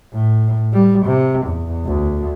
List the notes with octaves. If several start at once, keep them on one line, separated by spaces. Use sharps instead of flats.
A2
G3
C3
E2
D2